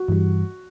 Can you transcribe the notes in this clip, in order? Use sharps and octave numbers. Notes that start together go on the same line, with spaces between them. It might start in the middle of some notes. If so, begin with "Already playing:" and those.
Already playing: F#4
G2 E3 G3